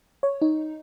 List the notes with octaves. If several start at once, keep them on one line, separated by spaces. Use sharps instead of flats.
C#5
D#4